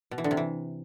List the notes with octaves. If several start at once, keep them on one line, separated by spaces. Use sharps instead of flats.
B2
E3
D3
C3
E3